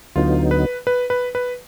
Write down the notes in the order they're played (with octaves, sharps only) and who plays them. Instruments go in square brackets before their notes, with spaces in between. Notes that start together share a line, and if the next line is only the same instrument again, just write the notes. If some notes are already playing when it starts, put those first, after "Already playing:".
[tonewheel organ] D2 D3 F#3 B3 D#4 [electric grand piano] F4
[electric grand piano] B4
B4
B4
B4